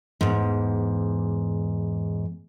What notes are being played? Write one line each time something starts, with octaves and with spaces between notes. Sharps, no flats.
E2 G#2